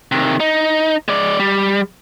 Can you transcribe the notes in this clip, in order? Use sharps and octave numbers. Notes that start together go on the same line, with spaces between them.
C3 D#3
D#4
G#3 D5
G3